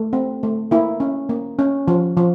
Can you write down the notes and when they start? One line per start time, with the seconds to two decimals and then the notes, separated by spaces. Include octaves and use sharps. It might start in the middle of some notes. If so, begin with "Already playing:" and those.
Already playing: A3
0.13 C4
0.43 A3
0.71 A#3 E4
1.00 C#4
1.29 A#3
1.59 C#4
1.88 F3
2.17 F3